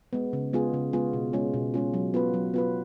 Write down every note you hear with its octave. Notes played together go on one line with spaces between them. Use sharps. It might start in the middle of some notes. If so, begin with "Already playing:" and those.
G#3 B3
C#3
G#3 B3 F4 G#4
C#3
G#3 B3 F4 G#4
B2
G#3 C#4 F4
B2
G#3 C#4 F4
F#3
B3 F4 B4
F#3
B3 F4 B4